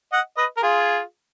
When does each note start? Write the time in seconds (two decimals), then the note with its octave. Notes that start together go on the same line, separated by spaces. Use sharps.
0.12 D#5 F#5
0.37 B4 D#5
0.57 A#4
0.62 F4 G#4